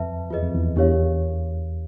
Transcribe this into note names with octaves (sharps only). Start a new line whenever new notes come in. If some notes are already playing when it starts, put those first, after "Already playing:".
Already playing: F2 B4 E5 A5
E2 F4 G#4 B4 D#5
F2
E2
E2 D4 G4 A#4 C#5 F5